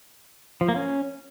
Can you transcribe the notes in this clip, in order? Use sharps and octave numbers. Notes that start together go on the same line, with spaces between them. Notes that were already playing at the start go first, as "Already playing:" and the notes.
F3
A#3
C#4